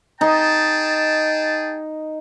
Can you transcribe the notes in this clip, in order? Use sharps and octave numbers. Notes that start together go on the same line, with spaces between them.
D#4 G#4 G5 A5